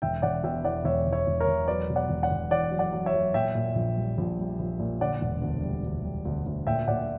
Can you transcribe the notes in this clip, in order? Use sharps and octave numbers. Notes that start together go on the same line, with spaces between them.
E1 E5 G5
E1 D5 F#5
B2 E5 G5
E2 D5 F#5
E1 C#5 E5
E1
C#5 E5
E1
A#4 C#5
E1
F#3 B4 D5
B2
D5 F#5
E1
D5 F#5
E1
E2 D5 F#5
F#3
D5 F#5
F#3
C#5 E5
F#3
A#2 E5 G5
A#2
A#1
G3
A#1
G3
A#1
A#2
D3 D5 F#5
E1
D2
G3
D2
G3
D2
D2
A#2 E5 G5
A#2 D5 F#5